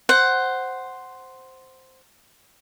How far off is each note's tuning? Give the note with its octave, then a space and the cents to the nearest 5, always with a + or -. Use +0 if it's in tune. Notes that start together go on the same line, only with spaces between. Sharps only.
C5 +0 F#5 +10